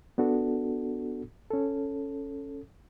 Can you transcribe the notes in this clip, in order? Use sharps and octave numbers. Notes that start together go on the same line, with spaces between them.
B3 D4 F#4 A4
C#4 A4